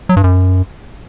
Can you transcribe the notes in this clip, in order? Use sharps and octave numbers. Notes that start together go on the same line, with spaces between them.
F#3
G2
F#2